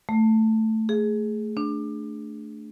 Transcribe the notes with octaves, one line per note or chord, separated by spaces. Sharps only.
A3
G#4
D4